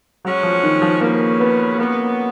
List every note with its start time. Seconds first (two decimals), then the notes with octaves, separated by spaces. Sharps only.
0.25 F#3 G#3 C#4 F#4
0.43 F3
0.63 D#3
0.82 F3
1.01 C#3 F#3 A#3 C#4 G#4 B4
1.40 B3
1.78 C#3 F#3 A#3 B3